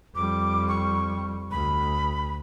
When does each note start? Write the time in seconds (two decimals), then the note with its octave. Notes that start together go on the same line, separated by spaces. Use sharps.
0.15 F2 G3 D6
0.68 C#6
1.51 D2 B5